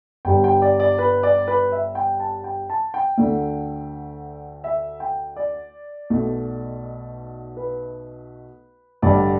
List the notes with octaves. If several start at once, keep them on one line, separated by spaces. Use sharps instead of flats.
G1 G2 G3 G5
G5
D5
D5
B4
D5
B4
E5
G5
A5
G5
A5
G5
D2 D3 A3
E5
G5
D5
B1 B2 A3
B4
A1 G2 D3 A3 D5